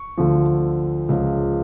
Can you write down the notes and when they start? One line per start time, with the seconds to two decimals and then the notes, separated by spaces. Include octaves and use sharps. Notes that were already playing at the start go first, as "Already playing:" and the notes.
Already playing: C#6
0.17 D2 D3 F3
1.09 C#2 C#3 F3